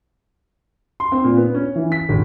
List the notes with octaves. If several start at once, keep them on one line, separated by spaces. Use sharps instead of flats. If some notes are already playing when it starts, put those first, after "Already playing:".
C6
C4
A#2
B3
C#4
E3
B6
G#1